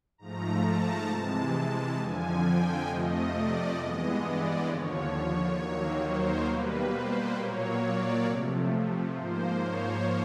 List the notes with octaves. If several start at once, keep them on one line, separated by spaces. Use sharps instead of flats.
G#2 F3 A3 A#5
A5
C3 E3 G#3 A5
F2 D3 F3 G#5
G5
F2 C3 F3 A3 D#5
D5
G2 E3 G#3 B3 D#5
D5
D#2 D3 F3 C#5
D#2 D#3 F#3 A#3
C5
B2 G3 A#3 B4
C5
A#2 F#3 A#3 C#5
D5
C3 F3 A3
G#2 F3 A#3 C5
C#5